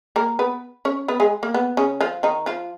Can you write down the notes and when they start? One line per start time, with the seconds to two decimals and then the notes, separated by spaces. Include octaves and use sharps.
0.16 A#3 A#4
0.39 B3 B4
0.85 C#4 C#5
1.08 B3 B4
1.20 G#3 G#4
1.43 A#3
1.54 B3
1.77 C#3 C#4
2.01 F3 F4
2.23 D#3 D#4
2.46 F3 F4